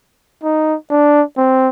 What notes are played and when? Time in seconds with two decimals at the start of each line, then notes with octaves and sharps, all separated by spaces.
0.43 D#4
0.90 D4
1.37 C4